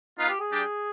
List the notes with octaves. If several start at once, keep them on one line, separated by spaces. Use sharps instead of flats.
B3 D#4 F4 B4 F5
G4
G#4
G3 D4 G4 D5 G5